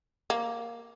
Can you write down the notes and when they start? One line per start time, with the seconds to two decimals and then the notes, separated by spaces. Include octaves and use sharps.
0.30 A#3